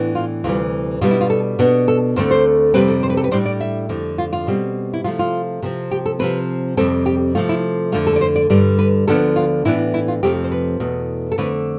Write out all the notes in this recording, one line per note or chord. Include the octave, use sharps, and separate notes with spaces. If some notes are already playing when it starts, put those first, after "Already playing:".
Already playing: A2 E3 B3 D4
F4
D2 C3 E3 G3 F4
B2 G3 B3 D4 F4
E4
F4
A4
B2 B3 D4
A4
D2 D3 A3 C4 C5
C5
F2 C3 G3 C4 B4
A4
C5
B4
A4
B4
A2 G3 D4 C5
D5
E5
F2 D3 A3 C4
F4
F4
B2 G3 C4
E4
C3 F3 A3 F4
F4
C3 F3 C4
G4
A4
C3 F3 C4 B4
F2 C3 G3 C4 A4
G4
C3 F3 A3 F4
E4
F2 D3 A3 F4
A4
D5
C5
D5
G2 D3 G3 D5
B4
D2 D3 F3 B3 D4 A4
F4
A2 E3 B3 D4 E4
E4
F4
F2 C3 F3 A3 C4 G4
C5
B4
E2 B2 A3
A4
F2 D3 A3 C4 B4